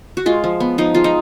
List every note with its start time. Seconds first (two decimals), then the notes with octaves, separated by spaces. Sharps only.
0.17 F#4
0.26 G#3 F4
0.44 F3
0.60 B3
0.78 F3 D#4
0.94 G#3 F4
1.04 D#4